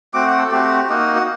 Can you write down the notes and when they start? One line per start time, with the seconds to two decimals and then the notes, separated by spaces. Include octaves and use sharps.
0.14 A3 C4 F#4 D6
0.27 F#5
0.38 A4
0.51 A3 C4 F#4 G4
0.89 A#3 D#4 F#4
1.16 F#4